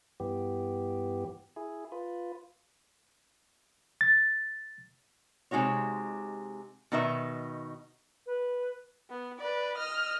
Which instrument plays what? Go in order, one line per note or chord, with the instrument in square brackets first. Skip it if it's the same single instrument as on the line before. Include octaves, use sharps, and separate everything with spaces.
[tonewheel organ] G2 E3 B3 G4
E4 G#4
F4 B4
[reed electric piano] A6
[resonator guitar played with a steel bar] C3 G#3 D#4 F#4 C#5
B2 D#3 D#4 B4 E5
[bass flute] B4
[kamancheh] B3
B4 D5
D#5 F6